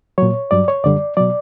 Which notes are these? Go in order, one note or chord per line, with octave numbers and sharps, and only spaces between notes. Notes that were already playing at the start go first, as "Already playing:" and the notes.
A#2 F#3 C#5
G2 F#3 D5
C#5
F#2 D3 G3 D5
B2 F#3 D5